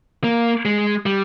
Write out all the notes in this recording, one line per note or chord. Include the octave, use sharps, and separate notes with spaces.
A#3
G#3
G3